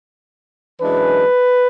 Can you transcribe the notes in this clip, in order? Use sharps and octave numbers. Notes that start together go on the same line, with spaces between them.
F#2 E3 G#3 D4 B4